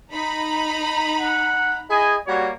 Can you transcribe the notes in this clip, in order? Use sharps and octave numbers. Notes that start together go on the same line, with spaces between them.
D#4 A#5 B5
F#5
E4 G#4 D#5 G#5
G3 A#3 F#4 C#5